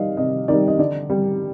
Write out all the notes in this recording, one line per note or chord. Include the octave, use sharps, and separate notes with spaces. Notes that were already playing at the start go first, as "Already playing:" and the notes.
Already playing: D#3 G3 D5 D#5 F5
C3 D#5
D#3 G3 D5
D#5
D3 D5
G3